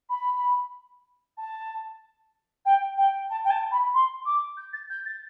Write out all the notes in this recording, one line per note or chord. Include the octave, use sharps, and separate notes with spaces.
B5
A5
G5
G5
A5
G5
A5
B5
C6
D6
G6
A6
G6
A6